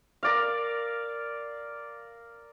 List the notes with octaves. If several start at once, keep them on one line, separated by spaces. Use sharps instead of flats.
A#4 D5 F5